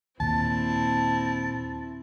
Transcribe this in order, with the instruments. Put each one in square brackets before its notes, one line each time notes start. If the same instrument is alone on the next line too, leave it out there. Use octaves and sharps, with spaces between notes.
[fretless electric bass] D#2 A#2 [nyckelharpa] C4 E4 [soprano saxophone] A5